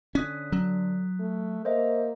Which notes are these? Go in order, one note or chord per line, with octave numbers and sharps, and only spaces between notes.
D3 C#4 D#6 F#6 B6
F#3
A3
A#3 C5 D#5 E5